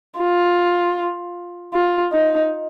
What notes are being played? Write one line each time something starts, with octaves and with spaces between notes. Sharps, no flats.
F4
F4
D#4